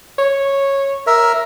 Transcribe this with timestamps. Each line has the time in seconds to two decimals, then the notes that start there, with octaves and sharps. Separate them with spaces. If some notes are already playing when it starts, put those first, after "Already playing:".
0.19 C#5
1.07 A#4 E5